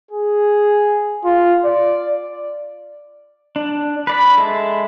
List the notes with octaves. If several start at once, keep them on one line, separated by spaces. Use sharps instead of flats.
G#4
F4
D5
D4
B4 D5 B5
G#3 A4 E5